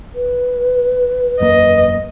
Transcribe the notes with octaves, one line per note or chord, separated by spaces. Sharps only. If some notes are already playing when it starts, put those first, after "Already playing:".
B4
E1 F#2 A#3 D#5